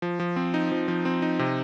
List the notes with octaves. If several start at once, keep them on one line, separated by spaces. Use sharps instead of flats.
F3
F3
C4
D#4
F3
F3
C4
D#4
C3